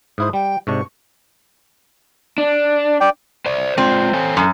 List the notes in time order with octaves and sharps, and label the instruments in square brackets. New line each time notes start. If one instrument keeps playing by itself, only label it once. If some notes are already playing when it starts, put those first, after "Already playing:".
[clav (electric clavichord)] G#2 E4 C5 [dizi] D#6
[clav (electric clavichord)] G3 [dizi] G5
[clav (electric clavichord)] G#2 C3 D4 [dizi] C#6
[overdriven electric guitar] D4
[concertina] D5 G5
[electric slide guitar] C5 D5
[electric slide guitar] G#3 F4 D5 [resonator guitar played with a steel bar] C4
[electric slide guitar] A4 C#5 G#5
[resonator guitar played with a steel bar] F#2